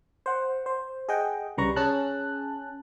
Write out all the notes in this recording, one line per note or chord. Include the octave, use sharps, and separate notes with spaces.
C5 F#5
C5
G#4 D#5 F#5 G5
C2 C#3 G3 B4 A#5 C#6
C#4 G#4 A5 F#6